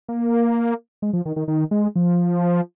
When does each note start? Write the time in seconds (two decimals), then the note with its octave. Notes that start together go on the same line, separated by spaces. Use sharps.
0.08 A#3
1.02 G#3
1.13 F3
1.25 D#3
1.36 D#3
1.48 D#3
1.71 G#3
1.96 F3